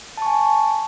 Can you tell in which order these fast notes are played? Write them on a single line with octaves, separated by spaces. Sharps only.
A5 C#6 G#5